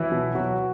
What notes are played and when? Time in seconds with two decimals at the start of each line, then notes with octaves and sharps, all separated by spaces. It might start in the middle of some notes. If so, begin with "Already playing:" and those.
Already playing: E3 F#3 E4
0.12 B2
0.35 B2 F#3 F#4